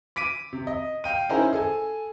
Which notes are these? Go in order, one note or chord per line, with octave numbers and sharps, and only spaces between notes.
D6 B6 D7 D#7
C3
D#5
F5 G5 D#7
C#4 D#4 E4 G#4 A#4 C5
G#4 A4 G#5